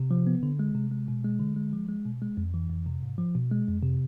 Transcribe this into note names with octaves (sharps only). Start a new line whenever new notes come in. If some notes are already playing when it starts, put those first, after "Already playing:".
Already playing: C3
F3
B3
D3
G#3
C3
G#3
B2
G#3
D3
G#3
F3
G#3
B2
G#3
F2
E3
F2
C3
G#2
F3
B2
G#3
F2
C3